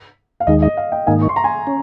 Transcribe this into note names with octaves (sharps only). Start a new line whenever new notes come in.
F5
D#2 D#3 G#3 D#4 D#5
D#5
F5
D#5 G5
G#2 D#3 A#3 D#4 F5 G#5
C#6
C6
A#5
G#5 C6
C#4